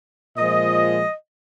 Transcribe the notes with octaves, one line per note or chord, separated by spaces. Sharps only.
A#2 F3 G#3 D#5